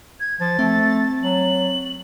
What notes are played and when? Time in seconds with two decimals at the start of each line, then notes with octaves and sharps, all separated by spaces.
0.20 G#6
0.40 F3 A6
0.59 A3 C4
1.23 F#3 F#7